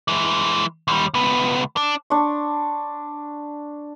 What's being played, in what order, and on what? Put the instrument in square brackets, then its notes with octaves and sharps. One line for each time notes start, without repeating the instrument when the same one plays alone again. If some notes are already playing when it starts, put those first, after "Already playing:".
[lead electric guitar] E3 G#3
D#2 G3
C#2 B3
D4
[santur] D4 C6 C#6